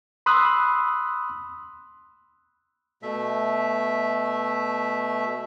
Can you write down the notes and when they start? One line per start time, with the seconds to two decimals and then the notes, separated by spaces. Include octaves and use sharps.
0.26 B5 C6 D#6 E6 F#6
3.02 B2 A3 E5